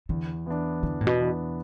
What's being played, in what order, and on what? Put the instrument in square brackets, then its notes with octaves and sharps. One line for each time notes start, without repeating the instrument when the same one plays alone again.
[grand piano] E2 [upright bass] D3
[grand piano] E3 B3 D4
[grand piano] E2 [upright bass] D3
[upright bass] A2
B2
[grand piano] E3 B3 D4